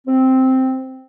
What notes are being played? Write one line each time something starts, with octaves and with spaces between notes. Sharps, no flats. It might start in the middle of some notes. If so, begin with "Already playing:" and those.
C4